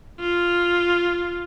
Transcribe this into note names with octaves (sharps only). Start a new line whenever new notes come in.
F4